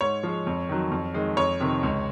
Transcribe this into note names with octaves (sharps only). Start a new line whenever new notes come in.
G#2 C#5
F3 G#3
F2
D#3 F#3
F2
D#3 G#3
F2 C#5
C3 D#3
C#2